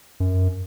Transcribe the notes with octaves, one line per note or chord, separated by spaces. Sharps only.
F#2